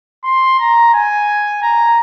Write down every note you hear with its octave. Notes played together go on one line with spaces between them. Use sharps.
C6
A#5
G#5
A#5